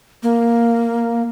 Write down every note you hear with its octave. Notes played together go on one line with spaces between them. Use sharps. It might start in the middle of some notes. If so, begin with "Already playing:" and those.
A#3